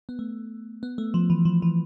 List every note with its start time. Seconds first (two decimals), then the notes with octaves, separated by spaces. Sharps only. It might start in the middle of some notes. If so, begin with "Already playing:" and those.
0.09 B3
0.19 A3
0.83 B3
0.98 A3
1.14 F3
1.30 E3
1.45 F3
1.62 E3